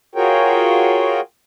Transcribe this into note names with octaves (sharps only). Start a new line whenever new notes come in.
F4 F#4 G#4 A#4 C#5 G5